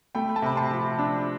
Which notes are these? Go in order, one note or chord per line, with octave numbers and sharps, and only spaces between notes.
A3 G5 B5
A5
C3 B5
A5 C6
F3
D4